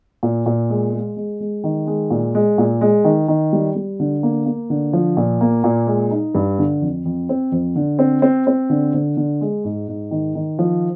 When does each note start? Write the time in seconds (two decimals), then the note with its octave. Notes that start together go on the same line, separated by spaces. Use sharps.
0.23 A#2
0.46 A#2
0.70 G#3
0.92 G#3
1.16 G#3
1.40 G#3
1.64 D#3
1.87 G#3
2.11 A#2
2.35 G#3
2.58 A#2
2.81 G#3
3.04 D#3
3.28 D#3
3.53 G3
3.76 G3
4.00 D3
4.23 A#3
4.46 A#3
4.70 D3
4.93 F3
5.17 A#2
5.41 A#3
5.64 A#2
5.87 G#3
6.11 D#4
6.35 G2
6.59 D3
6.82 F2
7.05 F2
7.29 C4
7.52 F2
7.76 D3
7.99 C4
8.22 C4
8.47 C4
8.70 D3
8.94 D3
9.17 D3
9.41 G#3
9.64 G#2
9.88 G#2
10.11 D#3
10.35 D#3
10.59 F3